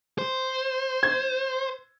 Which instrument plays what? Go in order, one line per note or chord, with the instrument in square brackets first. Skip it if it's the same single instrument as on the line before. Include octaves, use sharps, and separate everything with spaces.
[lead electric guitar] C5
[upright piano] G#6